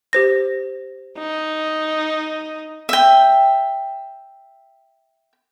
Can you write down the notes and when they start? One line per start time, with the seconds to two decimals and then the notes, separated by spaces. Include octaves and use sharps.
0.13 G4 C5 A#6
1.18 D#4
2.89 E5 G5